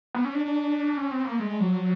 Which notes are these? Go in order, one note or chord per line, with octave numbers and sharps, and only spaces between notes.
B3
C#4
D4
D4
C#4
C4
A#3
G#3
F#3